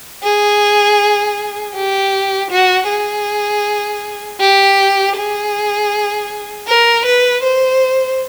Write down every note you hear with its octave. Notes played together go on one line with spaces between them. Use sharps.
G#4
G4
F#4
G#4
G4
G#4
A#4
B4
C5